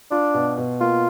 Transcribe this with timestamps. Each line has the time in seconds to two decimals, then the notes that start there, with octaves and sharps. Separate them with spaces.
0.11 D4 F4
0.34 B2
0.58 B2
0.80 A#3 F4